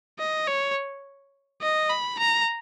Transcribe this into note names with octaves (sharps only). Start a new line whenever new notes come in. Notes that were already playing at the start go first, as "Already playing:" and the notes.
D#5
C#5
D#5
B5
A#5